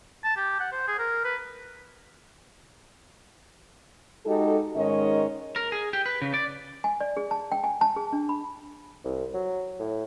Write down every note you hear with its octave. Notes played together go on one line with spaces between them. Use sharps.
A5
G4
F#5
C5
G#4
A#4
B4
G#3 D#4 F#4 G4 A4
G#2 D#3 G#3 C#4 C#5 D#5
A#4
G#4
G4
B4
C#3
D5
G#5
D5
G#4
A5
G5
G#5
A5
G#4
D4
B5
C2
F#3
A2